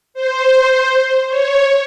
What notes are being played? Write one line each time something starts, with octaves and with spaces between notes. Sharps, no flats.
C5
C#5